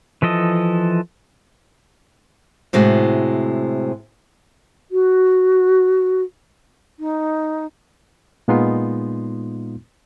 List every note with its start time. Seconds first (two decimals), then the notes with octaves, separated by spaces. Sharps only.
0.22 E3 F3 A4 D#5
2.73 A2 C3 G#3 F#4
4.91 F#4
7.00 D#4
8.48 A#2 G#3 B3 D#4 F4 C6